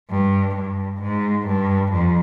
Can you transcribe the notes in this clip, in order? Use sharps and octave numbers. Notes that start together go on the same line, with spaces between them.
G2
G2
G#2
G2
F2